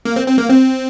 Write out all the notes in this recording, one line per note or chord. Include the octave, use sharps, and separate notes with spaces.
A#3
C4
C4
A#3
C4